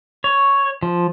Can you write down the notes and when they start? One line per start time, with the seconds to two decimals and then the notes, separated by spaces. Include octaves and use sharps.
0.24 C#5
0.83 F3